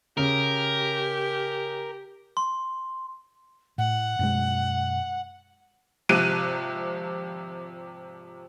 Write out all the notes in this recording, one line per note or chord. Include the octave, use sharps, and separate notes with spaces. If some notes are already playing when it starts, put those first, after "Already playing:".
C#3 G4 A#4
C6
A2 F#5
F#2 B2 G#3
G#1 C3 F3 F#6 D#7